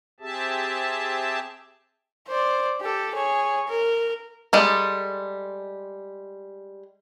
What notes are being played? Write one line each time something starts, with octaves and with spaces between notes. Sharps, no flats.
C4 G4 G#4 E5 A5
C5 D5
G4 A4
G#4 C#5
A#4
G3 G#3 A4